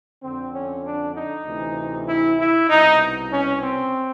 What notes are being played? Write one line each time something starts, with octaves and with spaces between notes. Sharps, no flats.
F2 D3 C4
C#4
D4
D#4
D2 C3 E3
E4
E4
C2 B2 D#4
C#4
C4